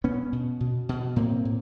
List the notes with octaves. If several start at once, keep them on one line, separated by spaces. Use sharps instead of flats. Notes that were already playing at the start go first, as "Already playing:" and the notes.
B2 B3 C#4
B2
B2
B2
A2 A#3 C4
A2